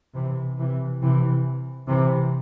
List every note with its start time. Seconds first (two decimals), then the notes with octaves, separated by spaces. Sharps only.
0.14 C3 E3
0.57 C3 E3
1.01 C3 E3
1.88 C3 E3